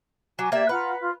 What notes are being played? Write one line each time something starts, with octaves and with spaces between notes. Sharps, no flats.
F#3 F#4 G#5 D6
A#3 G4 D5 E5 G#6
F4 B4 F#5 A#5
F4